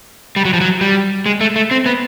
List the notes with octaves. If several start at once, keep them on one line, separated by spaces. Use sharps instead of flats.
G3
F#3
F3
F#3
G3
G#3
A3
A3
C4
B3